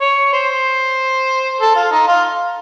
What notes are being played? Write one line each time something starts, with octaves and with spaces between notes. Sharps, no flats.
C#5
C5
A4
F4
D#4
F4